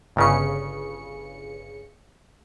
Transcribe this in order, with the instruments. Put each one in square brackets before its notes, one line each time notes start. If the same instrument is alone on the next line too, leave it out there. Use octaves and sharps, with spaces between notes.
[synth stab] G1 C#3 C#7